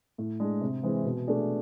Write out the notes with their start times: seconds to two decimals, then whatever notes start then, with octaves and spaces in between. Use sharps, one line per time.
0.18 A2
0.40 G#3 D4
0.61 C3
0.83 E3 G#3 C4
1.05 B2
1.27 A3 D4 G#4